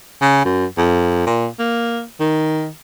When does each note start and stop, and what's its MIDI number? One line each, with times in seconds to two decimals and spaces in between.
0.22 0.42 49
0.45 0.65 42
0.77 1.25 41
1.26 1.47 46
1.59 2.03 58
2.20 2.68 51